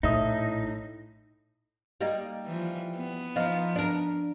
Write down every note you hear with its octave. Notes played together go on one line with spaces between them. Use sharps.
A#1 A2 D#4 E4 E5 D#6
G3 A#3 D#4
E3 F3
B3
F3 D#4 F4
D4 A#4